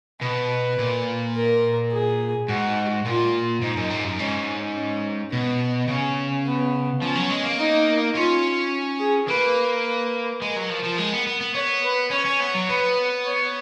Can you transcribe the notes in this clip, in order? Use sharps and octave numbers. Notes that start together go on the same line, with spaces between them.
B2 B4
A#2
A#4
G#4
G#2 F#4
A#2 F4
G#2 D#4
F#2
G#2
F#2
G#2 C#4
C#4
B2 B3
C#3 C#4
B3
F3 C#4
F#3
G#3
A#3
D#4
C#4 F4
G#4
A#3 B4
B4
G#3 A#4
F#3
F3
F3
G#3
B3
B3
B3
B3 C#5
B4
C#4 C#5
C#4
B3
F#3
B3 B4
C#5